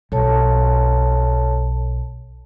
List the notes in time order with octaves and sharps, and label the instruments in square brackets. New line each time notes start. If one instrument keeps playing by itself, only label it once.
[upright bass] B1 [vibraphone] A4 C#5 A5